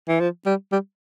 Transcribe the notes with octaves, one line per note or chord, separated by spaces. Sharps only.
E3
F3
G3
G3